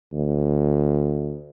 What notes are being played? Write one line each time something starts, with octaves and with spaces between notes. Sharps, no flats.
D2